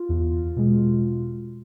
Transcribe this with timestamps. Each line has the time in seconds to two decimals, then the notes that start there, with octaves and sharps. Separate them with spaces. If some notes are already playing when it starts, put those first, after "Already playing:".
Already playing: F4
0.09 E2
0.56 B2 G#3